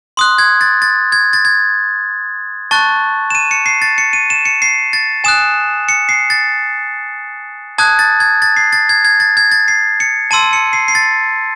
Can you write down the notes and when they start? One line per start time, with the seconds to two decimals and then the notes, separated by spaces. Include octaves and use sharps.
0.17 C6 D#6 F#6
0.38 G#6
0.61 A6
0.82 A6
1.12 G#6
1.33 A6
1.45 G#6
2.71 A5 C#6 F#6 A6
3.30 E7
3.35 D#7
3.51 C#7
3.66 C7
3.82 A6
3.98 C#7
4.13 D#7
4.30 E7
4.45 C#7
4.62 C7
4.93 A6
5.24 G#5 D#6 F#6 E7
5.89 C#7
6.09 C7
6.30 A6
7.78 A5 D#6 F#6 G#6
7.99 A6
8.20 G#6
8.42 A6
8.57 C7
8.73 A6
8.89 G#6
9.05 G#6
9.20 A6
9.37 G#6
9.52 A6
9.68 C7
10.00 C#7
10.31 A5 C6 E6 D#7
10.53 C#7
10.73 C7
10.88 C7
10.95 A6